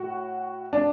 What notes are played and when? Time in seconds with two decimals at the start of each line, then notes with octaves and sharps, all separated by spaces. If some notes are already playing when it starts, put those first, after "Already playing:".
Already playing: A2 F#4
0.73 D4